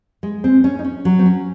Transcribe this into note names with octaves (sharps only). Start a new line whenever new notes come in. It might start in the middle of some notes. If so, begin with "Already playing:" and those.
G#3
C4
C#4
D#4
C#4
F#3
C4
C#4